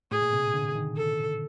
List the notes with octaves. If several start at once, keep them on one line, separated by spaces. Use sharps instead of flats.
A2 G#4
A#2
C3
D3
D#3
A4